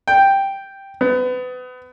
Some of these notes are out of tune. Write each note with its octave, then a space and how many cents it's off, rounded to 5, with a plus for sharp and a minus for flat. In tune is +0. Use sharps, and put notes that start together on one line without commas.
G5 +0
B3 +30